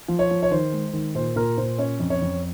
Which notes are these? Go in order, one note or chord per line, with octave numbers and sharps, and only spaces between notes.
F3
C#5
F3
C#5
D#3 C5
G#3
D#3
A#2 C5
A#2 A#4
A#2 C5
C#4 C#5
F2
C#5
F2